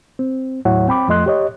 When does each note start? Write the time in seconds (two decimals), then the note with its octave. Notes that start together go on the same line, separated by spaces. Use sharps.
0.19 C4
0.65 D#2 A2 F#3 E4 C#5 F#5
0.88 C4 G5 B5 D6
1.08 F2 F3 A3 D#5 C6 F#6
1.26 G4 C#5 D#5